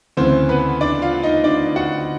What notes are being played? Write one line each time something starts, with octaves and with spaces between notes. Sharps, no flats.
D2 C#3 E3 C4 C5
B3 B4
D4 D5
F4 F5
D#4 D#5
D4 D5
F#4 F#5